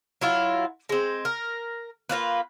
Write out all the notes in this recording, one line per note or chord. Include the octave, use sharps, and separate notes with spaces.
F#3 E4 F4
G#3 C4
A#4
A#3 C4 F4 B4